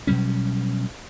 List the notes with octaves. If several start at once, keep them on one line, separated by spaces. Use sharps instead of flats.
B2 F#3 G3 C#4